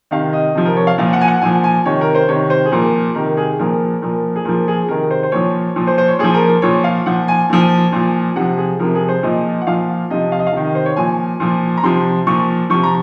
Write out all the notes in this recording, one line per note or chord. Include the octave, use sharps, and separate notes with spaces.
C3 D#3 F5
D#5
C3 F3
A#4
C#5
F5
A#2 F3 F5
F#5
G#5
F#5
A#2 F3 G#5
G#5
C3 D#3 C#5
A#4
C5
C3 D#3 C#5
C5
G#4
A#2 F3 A#4
C3 D#3 A#4
A#4
G#4
A#2 F3 A#4
A#2 F3 A#4
G#4
A#2 F3 A#4
G#4
C3 D#3 A#4
C5
C5
A#2 F3 C#5
A#2 F3
C5
C5
C#5
A#2 F3 G#4
A#4
A#2 F3 C#5
F5
A#2 F3 F#5
G#5
A#2 F3
A#2 F3
C3 F3 F#5
G#4
C3 F3 A#4
G#4
C5
A#2 F3 D#5
F#5
A#2 F3 F5
C3 F3 D#5
F5
D#5
F5
C3 D#3
D#5
C5
C#5
A#2 F3 G#5
A#2 F3
A#5
C3 F3 C6
A#2 F3 C#6
C3 F3 C#6
A#5